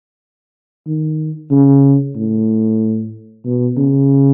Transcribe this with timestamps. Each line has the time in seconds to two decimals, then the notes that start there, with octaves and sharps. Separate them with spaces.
0.87 D#3
1.51 C#3
2.16 A2
3.45 B2
3.78 C#3